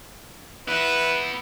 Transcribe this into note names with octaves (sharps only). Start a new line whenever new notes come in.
B3 E4 B4